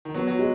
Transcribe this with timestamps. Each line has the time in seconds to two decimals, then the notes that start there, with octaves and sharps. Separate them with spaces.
0.05 D#3
0.14 F#3 B3
0.27 F#3
0.39 G#3 F#4